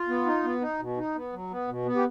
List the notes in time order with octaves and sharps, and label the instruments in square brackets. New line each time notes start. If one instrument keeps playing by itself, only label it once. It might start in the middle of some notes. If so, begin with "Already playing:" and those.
Already playing: [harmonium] F4
B3
D#4
B3
D#4
B2
D#4
B3
F#3
B3
B2
B3
G4